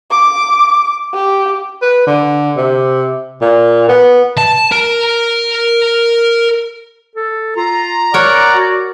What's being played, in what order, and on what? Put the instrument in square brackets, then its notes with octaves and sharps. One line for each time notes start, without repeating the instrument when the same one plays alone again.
[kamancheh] D6
G4
[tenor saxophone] B4
D3
C3
A#2
B3
[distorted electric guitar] A5
A#4
[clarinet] A4
[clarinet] F4 [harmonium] A#5
[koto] A#4 C#5 [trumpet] D5 [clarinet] F#5
[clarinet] F#4